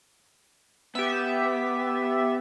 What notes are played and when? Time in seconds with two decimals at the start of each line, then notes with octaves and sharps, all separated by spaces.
0.95 B3 G4 E5